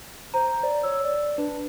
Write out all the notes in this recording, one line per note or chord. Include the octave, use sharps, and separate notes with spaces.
C5 A#5
D5
C#5 E6
D5
D4 B4